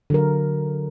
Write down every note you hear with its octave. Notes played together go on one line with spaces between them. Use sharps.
D3 F#3 A#4